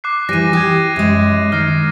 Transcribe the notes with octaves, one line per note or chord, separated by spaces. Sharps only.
D6 F#6 C7
E3 G3 A#6 D#7
G4 D#6 G#6
F#2 G#3
D#3 F6 A#6 C7